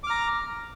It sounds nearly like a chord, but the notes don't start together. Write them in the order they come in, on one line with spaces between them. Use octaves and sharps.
D6 F6 A#5